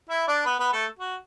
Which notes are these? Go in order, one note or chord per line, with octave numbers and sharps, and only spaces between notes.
E4 E5
D4 D5
B3 B4
B3 B4
A3 A4
F#4